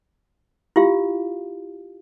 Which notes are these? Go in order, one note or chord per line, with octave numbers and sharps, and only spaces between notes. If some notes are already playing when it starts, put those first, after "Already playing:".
E4 F4 G4 F5